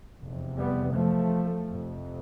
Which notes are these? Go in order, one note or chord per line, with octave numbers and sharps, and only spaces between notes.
F1 E2 C3
G3 B3
F3 A3
F1 F2 C3